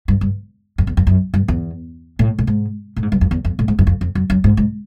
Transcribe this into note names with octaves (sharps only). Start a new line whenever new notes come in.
G2
G2
F2
E2
F2
F#2
G2
E2
A2
A2
G#2
A2
G#2
G2
F2
E2
F2
A2
G#2
F#2
F2
F2
F#2
F#2
G#2
G#2